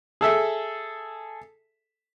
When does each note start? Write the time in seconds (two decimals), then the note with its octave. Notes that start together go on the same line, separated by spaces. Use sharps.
0.21 G#4 A4 E5